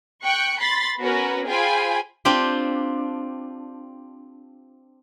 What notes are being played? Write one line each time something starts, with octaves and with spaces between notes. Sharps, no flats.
G5 C#6 F#6 C#7
B5 C6 A6
B3 C#4 F#4 A#4 B4
F4 G#4 C5 G5 G#5 B5
C4 D4 F4 G4